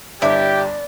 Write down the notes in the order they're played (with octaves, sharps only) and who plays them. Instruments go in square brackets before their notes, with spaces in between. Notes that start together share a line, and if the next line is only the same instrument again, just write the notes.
[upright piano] G1 [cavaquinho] E4 [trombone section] G4 [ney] D5